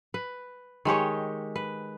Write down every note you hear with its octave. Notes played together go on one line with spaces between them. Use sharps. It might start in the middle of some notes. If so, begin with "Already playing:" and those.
B4
D#3 G#3 G4 C#5
B4